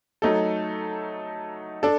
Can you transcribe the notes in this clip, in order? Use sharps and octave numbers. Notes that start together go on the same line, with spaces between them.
F#3 A3 D#4 A4
D4 A4